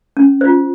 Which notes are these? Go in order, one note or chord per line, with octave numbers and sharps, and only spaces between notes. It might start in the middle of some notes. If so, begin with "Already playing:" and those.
C#4
F4 C5